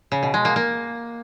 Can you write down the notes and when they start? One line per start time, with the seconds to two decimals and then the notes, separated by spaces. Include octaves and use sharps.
0.12 C#3
0.23 B2
0.34 G#3
0.45 A#3
0.56 A#3